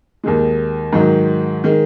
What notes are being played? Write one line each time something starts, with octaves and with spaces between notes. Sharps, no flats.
D#2 D#3 G#3
G#2 D#3 F#3
D#3 G#3